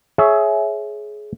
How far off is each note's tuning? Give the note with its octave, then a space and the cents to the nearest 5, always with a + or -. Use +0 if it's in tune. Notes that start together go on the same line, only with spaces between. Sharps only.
G#4 +20 C#5 +0 E5 +0